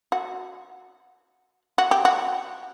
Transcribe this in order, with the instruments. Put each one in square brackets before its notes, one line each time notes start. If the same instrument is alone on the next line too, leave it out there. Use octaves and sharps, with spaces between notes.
[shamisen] F#4
F#4
G4
F#4